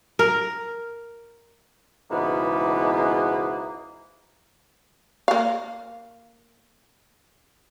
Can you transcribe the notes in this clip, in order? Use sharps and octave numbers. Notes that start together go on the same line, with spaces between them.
A#4
C#2 G#2 B2 E3 A#3 B3
A#3 F5